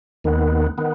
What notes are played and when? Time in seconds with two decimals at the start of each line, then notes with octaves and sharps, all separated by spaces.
0.24 D#2 D#3 B3
0.78 D#3 B3